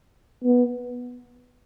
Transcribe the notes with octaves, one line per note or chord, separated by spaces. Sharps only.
B3